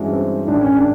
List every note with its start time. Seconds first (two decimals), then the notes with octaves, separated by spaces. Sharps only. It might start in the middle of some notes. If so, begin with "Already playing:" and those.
Already playing: G2 E3 G#3 C#4 F#4
0.12 C4
0.47 A1 G#2 D#3 D4
0.61 C#4
0.75 D4